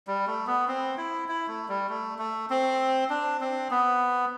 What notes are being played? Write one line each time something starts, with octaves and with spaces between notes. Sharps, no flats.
G3
A3
B3
C4
E4
E4
A3
G3
A3
A3
C4
D4
C4
B3